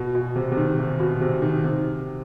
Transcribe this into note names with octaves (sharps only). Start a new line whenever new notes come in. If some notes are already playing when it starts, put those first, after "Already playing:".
Already playing: B2
B2
C3
C3
D#3
C3
B2
C3
D#3
C3